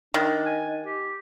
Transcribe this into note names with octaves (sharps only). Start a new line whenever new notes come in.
D#3 D4
G#5
G4